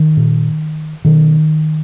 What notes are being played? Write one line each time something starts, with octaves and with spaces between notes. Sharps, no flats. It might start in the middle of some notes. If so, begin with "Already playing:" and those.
Already playing: D#3
A#2
B2 D#3